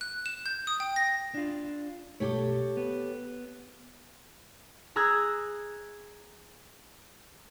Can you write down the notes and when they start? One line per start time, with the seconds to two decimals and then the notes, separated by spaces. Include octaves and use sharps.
0.01 F#6
0.26 E7
0.46 G6
0.67 D#6
0.80 G5
0.96 A#6
1.34 D4 F4
2.20 B1 A3 G4 A4 C#5
2.77 B3
4.96 G#4 A#5 E6 F#6 G#6